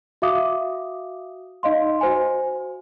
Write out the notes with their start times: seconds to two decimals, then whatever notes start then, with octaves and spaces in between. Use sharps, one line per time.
0.22 F#4 E5 F5 D6 D#6
1.63 D#4 D#5 F5 C6
2.01 F#4 C5 G#5